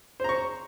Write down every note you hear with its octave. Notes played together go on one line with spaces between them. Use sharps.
C5 A#5 C#6